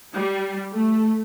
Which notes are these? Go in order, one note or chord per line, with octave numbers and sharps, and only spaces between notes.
G3
A3